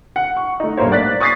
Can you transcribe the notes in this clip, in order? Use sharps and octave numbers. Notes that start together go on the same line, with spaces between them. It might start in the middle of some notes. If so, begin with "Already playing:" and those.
F#5
C#6
A3 D#4
B1 G2 A#3 C5 C#5
D5 F#6 A6 B6
C#6 D#6 G#6 A6 B6 C7